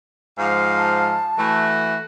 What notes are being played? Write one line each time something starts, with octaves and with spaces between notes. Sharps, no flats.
G#2 F3 F4 F5
A5
E3 A3 F#4